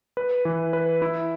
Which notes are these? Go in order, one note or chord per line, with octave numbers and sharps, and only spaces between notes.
B4
E3
B4
E4